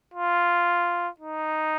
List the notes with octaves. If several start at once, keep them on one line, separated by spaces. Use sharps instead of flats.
F4
D#4